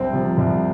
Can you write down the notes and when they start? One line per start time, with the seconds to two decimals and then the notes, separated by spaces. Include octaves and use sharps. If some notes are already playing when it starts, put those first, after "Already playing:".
Already playing: C2 C4
0.13 C3 F3
0.38 C2